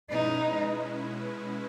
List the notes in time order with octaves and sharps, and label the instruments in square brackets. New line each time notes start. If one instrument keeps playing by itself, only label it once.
[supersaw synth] B2 G#3 C#4 E4 B4 [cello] D#4